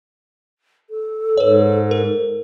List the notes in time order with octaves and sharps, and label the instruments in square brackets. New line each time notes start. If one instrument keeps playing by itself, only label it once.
[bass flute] A4
[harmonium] G#2 [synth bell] B4 C#5
[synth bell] A#4